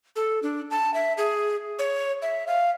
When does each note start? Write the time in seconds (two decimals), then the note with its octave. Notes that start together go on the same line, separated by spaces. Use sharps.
0.16 A4
0.43 D4
0.71 A5
0.94 E5
1.18 G#4
1.79 C#5
2.22 E5
2.47 F5